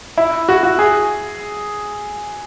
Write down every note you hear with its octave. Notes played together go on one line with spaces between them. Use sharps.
E4
F#4
F#4
G#4